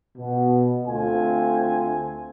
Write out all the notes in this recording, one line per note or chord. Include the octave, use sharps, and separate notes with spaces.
B2
D2 A3 C4 F4 G#5